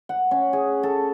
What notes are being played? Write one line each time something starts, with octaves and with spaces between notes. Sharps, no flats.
F#5
C#4
G#4
A4